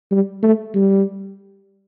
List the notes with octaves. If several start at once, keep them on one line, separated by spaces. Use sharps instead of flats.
G3
A3
G3